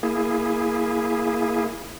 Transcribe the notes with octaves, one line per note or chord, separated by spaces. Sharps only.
A#3 E4 G#4